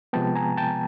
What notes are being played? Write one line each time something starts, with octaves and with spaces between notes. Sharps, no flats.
C3 F3 G#3 B3 G5 A5
G#5 A#5
G5 A5